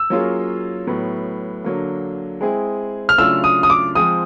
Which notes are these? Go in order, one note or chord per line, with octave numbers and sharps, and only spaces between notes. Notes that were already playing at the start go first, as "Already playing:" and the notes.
Already playing: E6
F#3 A#3 C#4 F4 G#4
A2 F#3 B3
D3 F#3 A#3
G#3 C4 E4 G#4
F6
C#3 F#3 A3 D4 F4 E6
D#6
D#6
D6
F3 G#3 C4 D#6